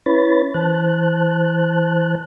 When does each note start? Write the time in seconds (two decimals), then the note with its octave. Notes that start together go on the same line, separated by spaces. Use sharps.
0.06 C#4 E4 B4 C#5 B5 A6
0.54 E3 C5 A5 F#6